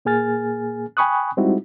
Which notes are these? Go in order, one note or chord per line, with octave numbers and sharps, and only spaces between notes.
A#2 A#3 G#4 G#5 F6 A6
G5 G#5 B5 C#6 D#6 F#6
G3 G#3 C4 D#4 E4 F#4